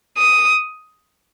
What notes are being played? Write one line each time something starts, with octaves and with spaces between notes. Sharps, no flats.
D#6